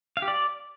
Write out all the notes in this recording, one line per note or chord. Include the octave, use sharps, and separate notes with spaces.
F5
G4
D5